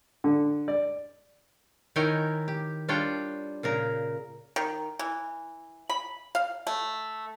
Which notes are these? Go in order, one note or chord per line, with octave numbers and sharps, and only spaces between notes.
D3
D5
D#3 E4 A#4 C#5 G5 G#5
G4
G3 D4 F4 C#5 G5
A#2 C#3 A#4
D#3
E3
B5
F5
A3